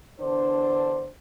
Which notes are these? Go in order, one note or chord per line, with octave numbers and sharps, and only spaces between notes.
E2 D3 D4 C5